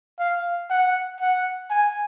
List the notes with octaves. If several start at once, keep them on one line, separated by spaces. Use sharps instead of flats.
F5
F#5
F#5
G#5